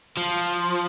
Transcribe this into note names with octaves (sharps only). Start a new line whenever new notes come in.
F3